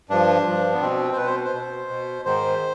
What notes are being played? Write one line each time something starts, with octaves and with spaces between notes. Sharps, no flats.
G2 F3 D4
G2 F3
B3
B2 C4
C5
B2 B4
C5
C5
B2
B2
G#2 D#3 C5